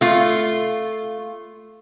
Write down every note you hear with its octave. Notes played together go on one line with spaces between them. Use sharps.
A3 F4